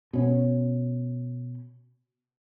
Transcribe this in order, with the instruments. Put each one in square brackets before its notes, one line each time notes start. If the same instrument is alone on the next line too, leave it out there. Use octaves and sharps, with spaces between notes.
[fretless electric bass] B2 C#4